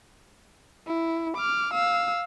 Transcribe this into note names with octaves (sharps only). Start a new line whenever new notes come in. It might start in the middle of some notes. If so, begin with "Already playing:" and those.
E4
D6 F6
F5 E6